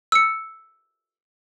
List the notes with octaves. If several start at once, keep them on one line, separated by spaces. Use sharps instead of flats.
E6 C#7